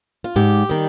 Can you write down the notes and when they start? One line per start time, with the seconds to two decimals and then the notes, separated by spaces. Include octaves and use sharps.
0.24 F4
0.36 G#2 G4
0.69 D#3 G3